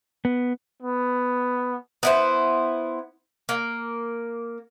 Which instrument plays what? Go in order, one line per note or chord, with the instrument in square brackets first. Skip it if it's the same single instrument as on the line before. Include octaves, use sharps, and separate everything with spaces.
[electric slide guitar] B3
[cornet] B3
[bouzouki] B3 E4 C5
A#3